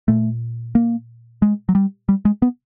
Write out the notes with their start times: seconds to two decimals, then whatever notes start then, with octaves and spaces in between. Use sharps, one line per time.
0.08 A#2 A3
0.75 A#3
1.42 G#3
1.69 F#3
1.75 G3
2.09 G3
2.25 G#3
2.42 B3